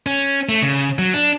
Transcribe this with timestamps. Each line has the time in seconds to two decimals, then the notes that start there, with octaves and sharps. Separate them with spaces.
0.06 C#4
0.49 A3
0.62 C#3
0.99 F#3
1.14 D4